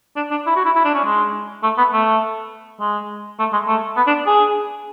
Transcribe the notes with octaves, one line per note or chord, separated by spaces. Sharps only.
D4
D4
E4
F#4
E4
E4
D4
C#4
G#3
A3
B3
A3
G#3
A3
G#3
A3
B3
D4
G#4